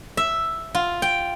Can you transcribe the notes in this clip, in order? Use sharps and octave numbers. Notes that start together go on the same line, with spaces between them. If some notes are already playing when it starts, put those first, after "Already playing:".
E5
F4
G5